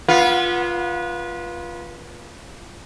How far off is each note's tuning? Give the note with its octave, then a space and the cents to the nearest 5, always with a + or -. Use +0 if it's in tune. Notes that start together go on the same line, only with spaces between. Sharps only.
B3 -25 F4 +0